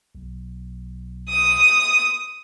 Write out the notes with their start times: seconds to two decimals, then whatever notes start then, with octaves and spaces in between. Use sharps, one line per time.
0.15 B1
1.30 D#6